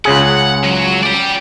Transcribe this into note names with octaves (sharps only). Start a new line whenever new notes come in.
C#2 C#3 G#4 F#5
F#3
D5 G5